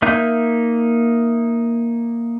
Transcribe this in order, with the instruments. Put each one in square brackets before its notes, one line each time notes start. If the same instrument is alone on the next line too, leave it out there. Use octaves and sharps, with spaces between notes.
[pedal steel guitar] A#3 D#4 E5 G6